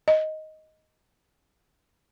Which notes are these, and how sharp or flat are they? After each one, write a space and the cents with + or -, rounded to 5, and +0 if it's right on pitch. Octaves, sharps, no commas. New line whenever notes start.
D#5 +5